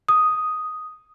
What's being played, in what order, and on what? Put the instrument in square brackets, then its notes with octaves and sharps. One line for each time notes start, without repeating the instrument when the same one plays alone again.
[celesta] D#6